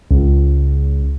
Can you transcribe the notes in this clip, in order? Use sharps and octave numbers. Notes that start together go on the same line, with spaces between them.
C#2